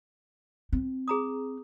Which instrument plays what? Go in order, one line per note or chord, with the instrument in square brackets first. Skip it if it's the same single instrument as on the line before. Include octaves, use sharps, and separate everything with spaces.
[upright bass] C4
[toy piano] G#4 A#5 D#6